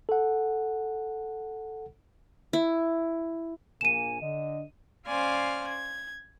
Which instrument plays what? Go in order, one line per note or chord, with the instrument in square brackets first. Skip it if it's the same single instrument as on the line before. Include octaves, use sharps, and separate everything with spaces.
[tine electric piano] A4 F#5
[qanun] E4
[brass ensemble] A#1 A#3 G#5 [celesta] D#7 E7
[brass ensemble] D3 D#5
[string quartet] C#4 C5 D5 F5 G#5 F6
G#6